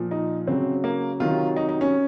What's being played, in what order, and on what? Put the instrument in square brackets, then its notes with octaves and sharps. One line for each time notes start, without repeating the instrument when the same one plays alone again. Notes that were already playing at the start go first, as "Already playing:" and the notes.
Already playing: [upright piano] A#2 F3
D#4
C#3 F#3 C4
A#3
C3 D#3 F#3 F4
D#4
D#4
C#4